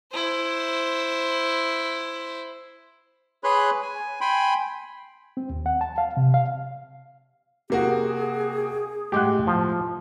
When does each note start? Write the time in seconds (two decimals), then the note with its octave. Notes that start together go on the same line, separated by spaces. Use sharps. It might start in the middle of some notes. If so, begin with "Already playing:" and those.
0.12 E4 C5
3.44 G#4 B4 C#5 B5 C6 F#6
3.82 G#5
4.21 G5 G#5 B5 C6
5.37 C4
5.50 D#2
5.66 F#5
5.81 A5
5.98 F5
6.17 C3
6.34 F5
7.70 C3 A#3 F#4 G#4
9.12 A2 G#3 G4 F#5
9.47 F3